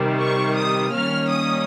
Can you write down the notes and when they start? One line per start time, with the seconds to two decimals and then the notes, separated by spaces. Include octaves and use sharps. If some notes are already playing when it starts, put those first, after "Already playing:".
Already playing: C3 D#3 G3
0.20 C#6
0.56 D#6
0.92 D#3 G3 A#3 C#4 F6
1.29 D#6